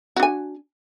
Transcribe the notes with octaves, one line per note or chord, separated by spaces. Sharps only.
D4 F#4 G#5